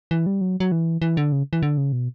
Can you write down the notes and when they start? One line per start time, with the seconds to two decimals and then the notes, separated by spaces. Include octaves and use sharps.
0.11 E3
0.26 G3
0.41 F#3
0.60 F#3
0.72 E3
1.02 E3
1.17 D3
1.32 C#3
1.53 E3
1.63 D3
1.77 C#3
1.92 B2